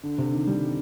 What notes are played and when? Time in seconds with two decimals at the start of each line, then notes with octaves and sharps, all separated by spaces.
0.03 D3
0.18 C3
0.33 D#3
0.47 G3